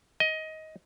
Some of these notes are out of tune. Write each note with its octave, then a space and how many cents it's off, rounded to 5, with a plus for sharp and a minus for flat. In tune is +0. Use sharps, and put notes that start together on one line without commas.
D#5 +15